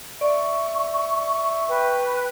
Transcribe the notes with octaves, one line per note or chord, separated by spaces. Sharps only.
D5 E5 C#6
B4 G5